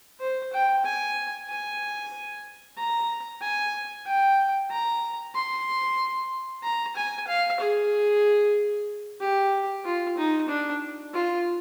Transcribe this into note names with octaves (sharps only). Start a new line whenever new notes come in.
C5
G5
G#5
G#5
A#5
G#5
G5
A#5
C6
A#5
G#5
F5
G#4
G4
F4
D#4
D4
F4